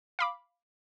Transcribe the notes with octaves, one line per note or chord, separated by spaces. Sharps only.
F5 B5 D6